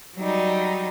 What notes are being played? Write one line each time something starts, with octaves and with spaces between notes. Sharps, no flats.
F#3 G3 D#4